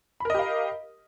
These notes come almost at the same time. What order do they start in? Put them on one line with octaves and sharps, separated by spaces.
B5 A#4 D#5 G4 F5